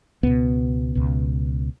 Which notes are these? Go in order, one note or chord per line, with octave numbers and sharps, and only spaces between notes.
C#2 B2 B3
C#2 B2